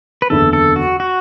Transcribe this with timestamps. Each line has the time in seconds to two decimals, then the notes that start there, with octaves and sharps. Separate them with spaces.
0.22 B4
0.30 F#1 E2 D3 A4
0.53 A4
0.76 F#4
1.00 F#4